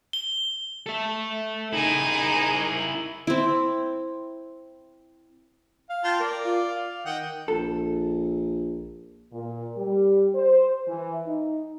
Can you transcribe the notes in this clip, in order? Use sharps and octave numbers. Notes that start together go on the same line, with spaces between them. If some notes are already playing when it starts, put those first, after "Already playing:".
G7
A4 E5
D#4 E4 G#4 A#4
C4 E4
F5
F4 G5 A5
A#4 D5
F4
F5
D#3 D#5 F#5 G5
A#1 A4
A#2
G3
C5
E3
D#4